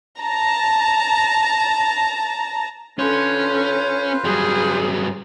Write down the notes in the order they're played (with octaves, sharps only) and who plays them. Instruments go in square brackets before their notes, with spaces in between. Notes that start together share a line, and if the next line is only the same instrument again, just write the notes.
[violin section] A5 A#5
[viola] D3 [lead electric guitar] C#4 [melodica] F4 B4 C5
[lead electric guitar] G2 F#3 [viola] G3 G#4